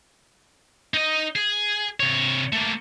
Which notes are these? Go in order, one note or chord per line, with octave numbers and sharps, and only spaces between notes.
D#4 D#5
G#4
C3 C#5
A3 A#3